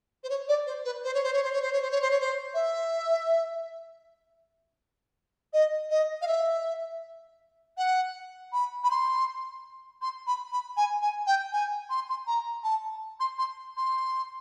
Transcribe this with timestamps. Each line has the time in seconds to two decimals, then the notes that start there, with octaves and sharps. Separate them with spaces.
0.23 C5
0.29 C#5
0.48 D5
0.66 C5
0.84 B4
1.04 C5
1.14 C#5
1.23 C5
1.33 C#5
1.43 C5
1.52 C#5
1.62 C5
1.72 C#5
1.82 C5
1.91 C#5
2.01 C5
2.10 C#5
2.20 C5
2.54 E5
5.53 D#5
5.90 D#5
6.21 F5
6.27 E5
7.77 F#5
8.52 B5
8.84 B5
8.90 C6
10.01 C6
10.27 B5
10.51 B5
10.77 G#5
11.02 G#5
11.27 G5
11.52 G#5
11.89 C6
12.09 C6
12.27 A#5
12.63 A5
13.20 C6
13.38 C6
13.77 C6